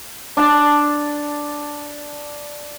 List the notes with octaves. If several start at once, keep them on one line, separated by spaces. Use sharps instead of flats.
D4 A5